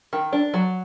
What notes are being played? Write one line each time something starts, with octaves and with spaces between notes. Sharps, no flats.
D#3
D4
F#3